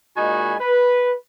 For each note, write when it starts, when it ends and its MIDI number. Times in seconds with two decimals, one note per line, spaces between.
0.17 0.55 46
0.17 0.55 56
0.17 0.55 63
0.17 0.55 66
0.17 0.55 80
0.17 0.55 83
0.59 1.13 71